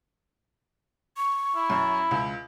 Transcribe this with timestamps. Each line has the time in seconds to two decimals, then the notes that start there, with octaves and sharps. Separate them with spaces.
1.17 C#6
1.55 E4
1.70 F#2
2.11 C#2